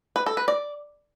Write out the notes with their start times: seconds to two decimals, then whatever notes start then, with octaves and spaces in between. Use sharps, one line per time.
0.16 B4
0.26 A4
0.37 B4
0.48 D5